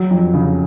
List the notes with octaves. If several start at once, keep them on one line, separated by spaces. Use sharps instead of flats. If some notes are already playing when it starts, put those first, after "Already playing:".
Already playing: F#3
F2
C#3